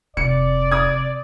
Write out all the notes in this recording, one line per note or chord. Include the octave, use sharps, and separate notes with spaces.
F1 C3 D5 C#7
D#6 G#6